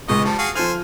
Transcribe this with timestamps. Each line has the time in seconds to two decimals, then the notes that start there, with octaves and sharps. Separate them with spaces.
0.08 C#2 G#3 B3 D#5 C#6
0.25 F3 G3 A5
0.38 F#4 G#4 F5
0.55 F3 A4 C5 G#5 F6